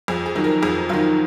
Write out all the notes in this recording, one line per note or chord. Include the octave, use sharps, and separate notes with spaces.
F2 G#4
G#4
D#3 F#3
A#4
F2 G#4
D#3 F#3 F4